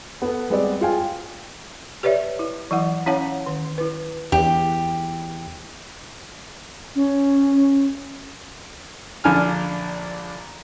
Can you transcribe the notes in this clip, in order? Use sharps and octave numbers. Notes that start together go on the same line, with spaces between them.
B3 A4
G3 G#3 B3 C4 B4 D5
F4 G#4 F5 G5 G#5
G4 B4 C#5 D5 E5
E4
E3 F#3 E4 F#5
C#4 E4 C#5 F5 F#5 A5
D#3
E4 B4
E2 G4
C#4
A#1 D3 G#5 F6